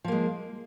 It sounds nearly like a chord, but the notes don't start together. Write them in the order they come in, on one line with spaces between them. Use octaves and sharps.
F3 A#3 G#3